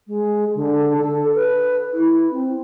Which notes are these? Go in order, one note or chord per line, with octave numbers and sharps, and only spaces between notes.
G#3
D3
A4
B4
E4
C4